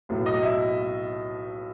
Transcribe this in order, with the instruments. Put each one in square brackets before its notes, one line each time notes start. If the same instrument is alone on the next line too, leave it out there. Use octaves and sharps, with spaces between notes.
[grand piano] B1 A2 F#3 B3
D#5
E5